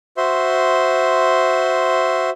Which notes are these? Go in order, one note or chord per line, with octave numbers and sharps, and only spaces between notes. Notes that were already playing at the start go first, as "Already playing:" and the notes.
F#4 C5 E5 C6